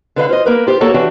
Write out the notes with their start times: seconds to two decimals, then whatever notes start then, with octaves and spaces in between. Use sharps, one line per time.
0.16 D3 B4 D#5 F5
0.29 F4 C5 D#5
0.46 A#3 A#4 B4
0.67 F4 G4 C5
0.81 A#3 F#4 A4 A#4 C#5 A5
0.94 E3 D4 F#4 G4